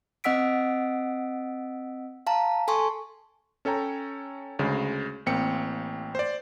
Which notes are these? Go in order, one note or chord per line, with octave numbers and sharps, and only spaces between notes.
C4 D#5 F#5 E6 B6 D7
F5 A5 A#5
A4 G#5 A5 C6 C#6
C#4 A4 C#5 G5 A#5
D2 C#3 G#3
A1 A#3 C4 G5 C#7
C5 D5